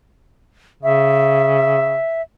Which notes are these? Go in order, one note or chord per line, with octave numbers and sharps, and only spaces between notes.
C#3 E5